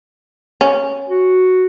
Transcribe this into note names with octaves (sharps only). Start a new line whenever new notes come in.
C#4
F#4